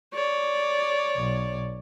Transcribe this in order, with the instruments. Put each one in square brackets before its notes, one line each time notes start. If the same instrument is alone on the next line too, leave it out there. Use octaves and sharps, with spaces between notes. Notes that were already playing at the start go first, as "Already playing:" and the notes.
[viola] C#5 D5
[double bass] B1